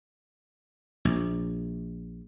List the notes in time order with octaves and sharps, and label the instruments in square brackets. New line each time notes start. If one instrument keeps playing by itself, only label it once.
[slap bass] A#1